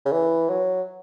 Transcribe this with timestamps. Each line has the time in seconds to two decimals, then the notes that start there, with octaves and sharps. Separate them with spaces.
0.05 C#3
0.12 E3
0.49 F#3